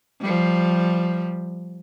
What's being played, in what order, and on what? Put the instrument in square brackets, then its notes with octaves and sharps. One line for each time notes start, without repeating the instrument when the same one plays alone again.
[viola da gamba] F3 G3